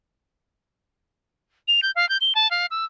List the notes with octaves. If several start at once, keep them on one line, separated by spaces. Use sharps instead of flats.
F7
G6
F5
G6
G7
A5
F5
E6